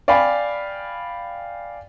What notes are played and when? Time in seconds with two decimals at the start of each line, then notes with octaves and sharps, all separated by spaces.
0.08 D5 F5 G5 G#5 B5